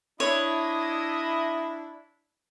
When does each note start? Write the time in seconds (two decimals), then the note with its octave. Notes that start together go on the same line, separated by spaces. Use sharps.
0.20 D4 E4 C#5 D#5